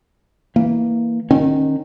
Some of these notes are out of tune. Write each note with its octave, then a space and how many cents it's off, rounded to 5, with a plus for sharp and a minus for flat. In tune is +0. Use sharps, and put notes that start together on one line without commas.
E3 -15 A#3 -10
D#3 -15 C#4 -30